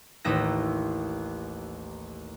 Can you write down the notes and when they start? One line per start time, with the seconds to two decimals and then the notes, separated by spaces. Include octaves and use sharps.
0.25 A1 D#2 D#4 E5 A#6